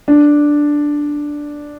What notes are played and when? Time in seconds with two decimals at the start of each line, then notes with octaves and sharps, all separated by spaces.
0.08 D4